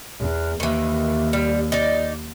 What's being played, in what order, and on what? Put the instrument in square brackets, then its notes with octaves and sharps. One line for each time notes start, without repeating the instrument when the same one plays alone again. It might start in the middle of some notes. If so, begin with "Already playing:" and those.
[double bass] E2
[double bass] D#2 [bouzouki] D#3 E3
[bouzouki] G3
D#4 D5